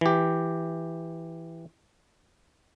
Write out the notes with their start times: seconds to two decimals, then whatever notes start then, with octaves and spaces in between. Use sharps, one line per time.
0.01 E3 G4